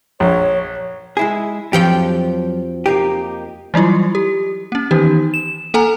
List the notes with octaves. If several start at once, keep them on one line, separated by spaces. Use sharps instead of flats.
A#1 C#5
G#3 E4 G#4
F2 F3 F#3 G4 G5
A#3 D#4 G4
E3 F#3 G3 E4 F4
G4
A#3 C#4
D#3 E3 B3 D#4 G4
E7
A#3 A4 F#5 G#5 A#5